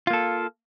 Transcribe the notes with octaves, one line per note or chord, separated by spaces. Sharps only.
A#3 F4 A4